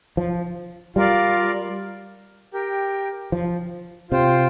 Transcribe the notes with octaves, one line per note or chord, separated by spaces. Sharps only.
F3
G3 F4 A#4 D5 F5
G4 A#4 G5
F3
C3 F4 C5 G5